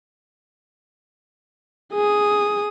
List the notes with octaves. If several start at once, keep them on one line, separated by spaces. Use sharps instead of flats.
G#4 D#6